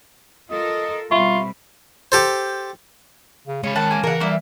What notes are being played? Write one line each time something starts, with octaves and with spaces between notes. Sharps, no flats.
F4 A4 A#4 D#5
B2 G3 C4 F4 E5 B5 C#6
G4 A4 C5
C#3
C#3 G#3 C#4 B5
D#3 F#5 A5
A#3 G#5
C#3 E3 A#4 F#5
G3 A#3 E4